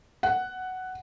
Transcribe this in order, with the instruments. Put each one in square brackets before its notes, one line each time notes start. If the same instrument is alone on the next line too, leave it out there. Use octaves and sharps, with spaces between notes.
[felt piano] F#5